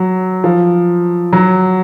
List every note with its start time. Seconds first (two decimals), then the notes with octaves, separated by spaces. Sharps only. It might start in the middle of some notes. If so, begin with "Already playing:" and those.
Already playing: F#3
0.44 F3
1.33 F#3